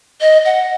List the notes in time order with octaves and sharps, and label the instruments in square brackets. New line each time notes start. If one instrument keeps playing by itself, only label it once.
[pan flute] D#5
F#5